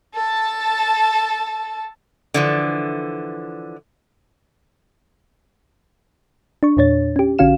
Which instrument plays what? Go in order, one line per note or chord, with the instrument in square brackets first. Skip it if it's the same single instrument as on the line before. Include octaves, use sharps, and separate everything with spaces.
[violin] A4 A5
[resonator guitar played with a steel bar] D3 E3 F3
[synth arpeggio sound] D4 C#6
E2 A#2 D4 C#5 A6
C#4 G4
A#1 D3 C#4 F#4 F5 E7